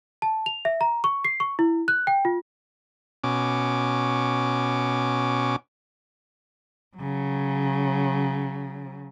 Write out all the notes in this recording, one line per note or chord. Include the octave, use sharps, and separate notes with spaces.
A5
F7
E5
A#5
C#6
C7
C#6
E4
F#6
G5
F4
B2 C#4 D6
C#3 F#3